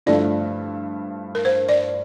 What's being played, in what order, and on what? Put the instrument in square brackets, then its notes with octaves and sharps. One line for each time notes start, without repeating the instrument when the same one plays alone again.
[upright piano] G2 D3 F3 A3 E4 [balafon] D5
[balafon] A#4
C5
D5